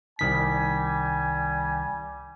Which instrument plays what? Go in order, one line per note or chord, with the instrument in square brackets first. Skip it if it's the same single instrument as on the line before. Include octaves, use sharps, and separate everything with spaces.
[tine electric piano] C2 D#3 B6 [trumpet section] G3 G#5